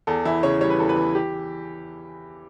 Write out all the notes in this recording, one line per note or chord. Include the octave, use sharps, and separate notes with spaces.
E2 A4
E3 E4
C#3 C#5
G3 C#5
B4
E2 A4
B4
E3
G4